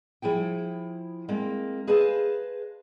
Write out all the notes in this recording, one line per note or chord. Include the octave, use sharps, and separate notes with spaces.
F3 E4 G#4 G5
G#3 A#3 C4
G#4 B4 C5 D#5 F5 A5